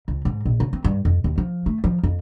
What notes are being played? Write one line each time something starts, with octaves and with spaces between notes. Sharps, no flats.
C#2
G#2
A#1
C#3
C4
G2
F2
D#2
F3
A3
F3
F2